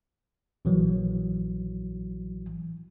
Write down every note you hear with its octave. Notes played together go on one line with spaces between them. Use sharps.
A#1 E3 F#3